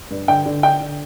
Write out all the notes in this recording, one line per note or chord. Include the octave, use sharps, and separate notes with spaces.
G2
D3 G5
D3
D3 G5
D3